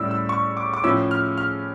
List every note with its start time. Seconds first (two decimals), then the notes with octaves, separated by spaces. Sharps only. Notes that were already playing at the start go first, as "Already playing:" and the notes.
Already playing: A2 G3 C#4 E4 E6
0.11 E6
0.29 C#6
0.57 D6
0.74 D6
0.84 A2 F3 C#4 E4 E6
1.11 F6
1.37 F6